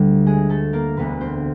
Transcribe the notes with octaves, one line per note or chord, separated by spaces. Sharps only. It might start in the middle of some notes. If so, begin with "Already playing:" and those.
Already playing: D2 D3 G3 G4
G#3 G#4
A3 A4
A#3 A#4
E1 D2 D3 B3 B4
C4 C5